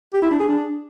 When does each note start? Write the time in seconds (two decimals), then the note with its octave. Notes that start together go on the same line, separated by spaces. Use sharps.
0.13 G4
0.22 E4
0.31 D4
0.39 G#4
0.48 D4